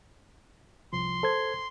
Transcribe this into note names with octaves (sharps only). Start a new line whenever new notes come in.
C2 F3 C6
A4 C5 G#6